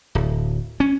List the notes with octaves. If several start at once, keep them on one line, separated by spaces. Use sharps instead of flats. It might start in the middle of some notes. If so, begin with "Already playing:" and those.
D1
C#4